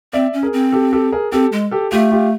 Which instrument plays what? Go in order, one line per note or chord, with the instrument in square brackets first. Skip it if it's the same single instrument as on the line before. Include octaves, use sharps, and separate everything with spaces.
[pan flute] C4 [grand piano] D5 E5
[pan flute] C#4
[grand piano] G#4 A#4
[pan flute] C4
[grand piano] G4 A4
G4 A4
G#4 A#4
[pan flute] C4 [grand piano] G4 A4
[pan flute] G#3
[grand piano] G4 A4
[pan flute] A3 [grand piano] F4 G4
[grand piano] F4 G4